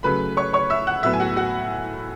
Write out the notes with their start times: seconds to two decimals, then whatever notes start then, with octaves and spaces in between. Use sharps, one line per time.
0.03 C#3 F#3 A3 B4 B5
0.37 C#5 C#6
0.53 C#5 C#6
0.70 E5 E6
0.87 F#5 F#6
1.03 A2 F#3 B3 E5 E6
1.14 G#5
1.20 F#4 F#5
1.36 F#4 F#5